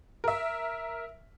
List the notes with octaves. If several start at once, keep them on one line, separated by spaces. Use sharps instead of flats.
A#4 E5